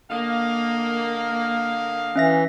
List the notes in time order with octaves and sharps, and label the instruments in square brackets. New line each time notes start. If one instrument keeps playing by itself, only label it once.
[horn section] D3 D#5 F5 [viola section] A#3
[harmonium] E3 [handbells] C#4 E5 A#6